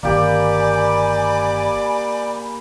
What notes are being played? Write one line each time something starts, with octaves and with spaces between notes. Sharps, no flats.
G1 C2 D#3 A#3 G4 D5 G#5 B5